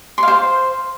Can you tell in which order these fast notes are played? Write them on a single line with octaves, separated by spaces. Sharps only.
C6 F5 C5